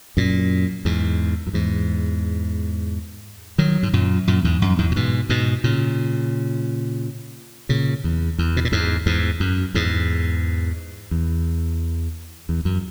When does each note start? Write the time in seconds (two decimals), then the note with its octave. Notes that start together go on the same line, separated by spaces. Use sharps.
0.17 F#2 A#2
0.85 E2 G#2
1.47 F#2
1.53 E2 G#2
3.58 D#3 F#3
3.83 G#2
3.93 F#2 A#2
4.27 F#2 A#2
4.45 E2 G#2
4.62 F#2
4.78 E2 G#2
4.91 A#2
4.96 G#2 B2
5.29 G#2 B2
5.64 A#2 C#3
7.69 A#2 C#3
8.04 E2
8.38 E2
8.57 B2
8.65 A#2
8.72 E2 G#2
9.06 E2 G#2
9.40 F#2
9.75 E2 G#2
11.11 E2
12.49 E2
12.65 F#2